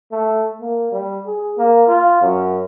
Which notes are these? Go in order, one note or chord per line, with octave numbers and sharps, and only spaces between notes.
A3
A#3
G3
G#4
A#3
F4
F#2